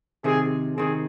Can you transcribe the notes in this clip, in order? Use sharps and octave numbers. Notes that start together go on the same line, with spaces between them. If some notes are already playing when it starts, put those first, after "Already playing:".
C3 D#3 C4 G#4
C3 D#3 C4 G#4